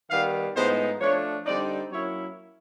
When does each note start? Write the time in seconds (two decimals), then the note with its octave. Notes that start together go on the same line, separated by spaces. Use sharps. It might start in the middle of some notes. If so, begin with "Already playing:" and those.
0.11 D#3 G3 B3 F5
0.56 A2 F3 G#3 B3 D#4 C5
1.00 F3 A3 D4 C#5
1.46 D3 G3 C4 D#4 D5
1.91 F#3 A#3 C#4 E4 C#5